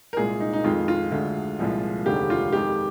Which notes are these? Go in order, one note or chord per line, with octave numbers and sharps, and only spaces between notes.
A#4
C2 A#2 G#3 G#4
D#4
D#4
F2 D#3 G#3 F4
F4
D2 D3 G#3
C2 A#2 F3 G#3
F1 D#2 D3 G#3 G4
F4
F2 D#3 G#3 G4